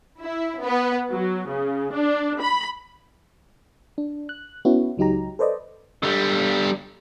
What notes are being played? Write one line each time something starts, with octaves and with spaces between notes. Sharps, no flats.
E4
B3
F#3
C#3
D4
B5
D4
F#6
B3 C#4 E4 F#4
C#2 F#3 D#4 G4 A#5
A4 B4 C5 D5 D#5
D3 G3